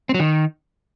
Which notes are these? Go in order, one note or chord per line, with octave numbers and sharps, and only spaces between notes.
C4
F#3
D#3